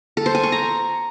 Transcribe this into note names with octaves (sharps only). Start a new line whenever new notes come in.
A4
C5
G#5
C#6
A#5